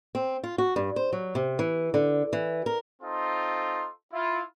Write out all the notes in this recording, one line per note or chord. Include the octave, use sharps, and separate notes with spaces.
C4
F4
F#4
G2
C5
F#3
C3
E3
D3
E3
A#4
C4 D#4 F4 A4 C6
E4 F4